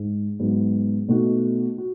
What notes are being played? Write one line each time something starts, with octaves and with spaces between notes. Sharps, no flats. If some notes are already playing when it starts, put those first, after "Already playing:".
Already playing: G#2
G#2 F#3 B3
B2 A3 D#4 F#4
F#4